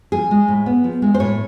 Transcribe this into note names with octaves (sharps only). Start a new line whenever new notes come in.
F3 G#4
G#3
A2
B3
F3
G#3
C5
A2 C#5